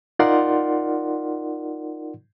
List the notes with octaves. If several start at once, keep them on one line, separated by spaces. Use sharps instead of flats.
D#4 F4 A#4 D5 F#5 C6